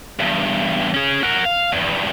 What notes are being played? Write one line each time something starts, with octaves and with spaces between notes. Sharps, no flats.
E2 G2
C#4 G#4
F#4 A#4
F5
E2 G2